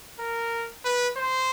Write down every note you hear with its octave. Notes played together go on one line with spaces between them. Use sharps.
A#4
B4
C5